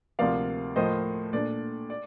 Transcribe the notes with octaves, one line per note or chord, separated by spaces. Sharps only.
D2 C3 F3 A#3 D5 F5
A2 F3 A#3 C5 D#5
A#2 A3 D4 D5
D5